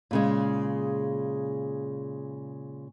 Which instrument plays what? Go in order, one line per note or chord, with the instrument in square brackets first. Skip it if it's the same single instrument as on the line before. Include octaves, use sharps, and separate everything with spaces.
[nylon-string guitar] A#2 C#3 G#3